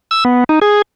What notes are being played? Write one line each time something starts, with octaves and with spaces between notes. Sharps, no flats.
E6
B3
D#4
G#4